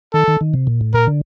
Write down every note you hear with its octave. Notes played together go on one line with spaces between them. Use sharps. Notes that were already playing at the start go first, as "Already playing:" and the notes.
D#3 A4
D#3
D#3
C3
A#2
A2
A#2 A#4
D3